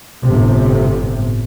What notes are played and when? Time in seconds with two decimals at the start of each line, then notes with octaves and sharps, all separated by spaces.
0.22 G1 A2 C3